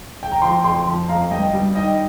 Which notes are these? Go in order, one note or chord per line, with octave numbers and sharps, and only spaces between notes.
G5
A#5
F3 G5 C6
F2 G5 C6
F3
F2 F5 A#5
G2 D#5 G5
G3
D#3 D#5 G5